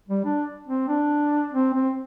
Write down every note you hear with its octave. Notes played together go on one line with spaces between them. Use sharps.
G3
D4
C4
D4
C4
C4